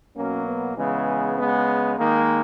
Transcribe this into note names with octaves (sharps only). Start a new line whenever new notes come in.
B2 F#3 A#3 C#4
B3
C#3 E3 G#3 B3
C#3 G#3 B3
D#3 G#3 A#3